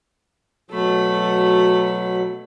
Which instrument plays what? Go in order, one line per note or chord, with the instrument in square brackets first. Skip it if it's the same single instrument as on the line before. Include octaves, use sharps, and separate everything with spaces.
[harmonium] B2 F#3 [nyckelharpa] A3 B5